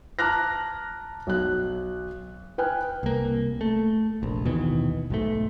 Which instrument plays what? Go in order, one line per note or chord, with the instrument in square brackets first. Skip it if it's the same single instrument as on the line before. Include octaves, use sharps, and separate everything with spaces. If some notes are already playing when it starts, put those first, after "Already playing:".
[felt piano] A5 A#5 D6 F6 F#6 A#6
B1 F#6
B4 G5 G#5 F6 F#6
[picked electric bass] C2 A#3
A3
F1 A#1
D#2 B2 D#3 E3
B1 G#2 A3